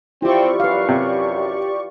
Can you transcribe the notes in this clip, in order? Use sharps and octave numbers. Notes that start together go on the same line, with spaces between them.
C4 E4 F4 G4 D5 C#6
F#2 B4 F5
C3